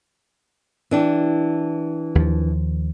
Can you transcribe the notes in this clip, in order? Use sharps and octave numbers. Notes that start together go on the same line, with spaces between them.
E3 D4 G4
D#2 F3